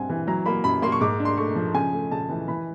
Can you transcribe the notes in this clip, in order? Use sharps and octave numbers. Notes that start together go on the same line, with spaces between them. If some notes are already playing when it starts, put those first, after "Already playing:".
Already playing: G2 G3 C4 F#5 G#5
E3
F#3 A#5
A#3 B5
F#2 B5
A#3 C6
C#6
G#2 D6
D4
C6
A3 C#6
F3
C#3 G#5
A3
C#3 A5
E3
E3 B5